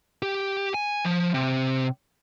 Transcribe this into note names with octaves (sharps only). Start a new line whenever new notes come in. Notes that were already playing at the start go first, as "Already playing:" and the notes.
G4
G#5
F3
C3